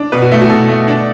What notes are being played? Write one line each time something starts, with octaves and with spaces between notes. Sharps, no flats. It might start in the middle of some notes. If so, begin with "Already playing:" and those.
Already playing: D4
B2 B4
F#4
A3 E4
F#4
B2 A4
A3
D4